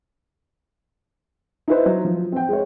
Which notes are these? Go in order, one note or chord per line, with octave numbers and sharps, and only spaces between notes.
D#4 E4 B4 C5 E5
F#3
F3
C4 G5
G#3 C#5